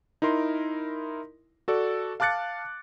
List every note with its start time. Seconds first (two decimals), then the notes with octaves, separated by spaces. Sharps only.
0.22 D#4 E4 A#4 C6
1.68 F#4 A4 D5
2.20 F5 A5 D6 F#6 A6 C#7